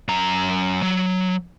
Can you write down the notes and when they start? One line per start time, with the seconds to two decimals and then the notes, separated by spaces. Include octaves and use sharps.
0.08 F#2 A#5
0.83 F#3